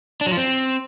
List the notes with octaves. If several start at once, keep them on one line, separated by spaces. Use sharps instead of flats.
D4
F#3
F3
C4